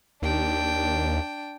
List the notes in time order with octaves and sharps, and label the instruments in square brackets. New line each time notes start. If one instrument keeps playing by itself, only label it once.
[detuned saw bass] D#2 [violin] D4 G5